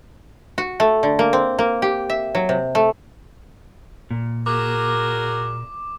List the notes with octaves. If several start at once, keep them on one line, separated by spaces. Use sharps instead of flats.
F#4
A3
D3
A#3
C4
A#3
G4
E5
F#3
C3
A3
A#2
F#4 G#4 A#4 D6